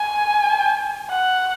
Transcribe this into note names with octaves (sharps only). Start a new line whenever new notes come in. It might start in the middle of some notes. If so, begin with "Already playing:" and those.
Already playing: G#5
F#5